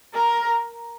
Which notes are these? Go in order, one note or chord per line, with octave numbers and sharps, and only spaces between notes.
A#4